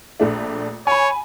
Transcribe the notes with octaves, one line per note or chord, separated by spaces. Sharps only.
A#1 A3 D4
C#5 G#5 B5